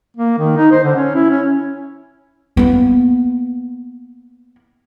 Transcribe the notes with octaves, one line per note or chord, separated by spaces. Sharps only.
A#3
D#3
D#4
C5
D3
C#4
E4
C#4
A#3 B3